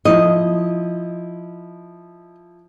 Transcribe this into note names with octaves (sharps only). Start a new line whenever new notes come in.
F3 E4 D#5